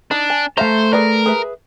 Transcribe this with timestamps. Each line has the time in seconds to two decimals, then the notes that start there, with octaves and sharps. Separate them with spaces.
0.11 D4 D#4
0.30 G#5
0.58 A3 C5 E5 F5 A5 A#5
0.93 G#4 A#4 B4 D5
1.26 G#4 B4 E5